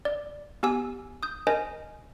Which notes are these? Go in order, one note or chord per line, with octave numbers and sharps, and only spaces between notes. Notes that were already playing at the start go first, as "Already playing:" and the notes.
D5
B3 G4 G#5 E6
D#6 G6
A#4 C5 D#5 G#5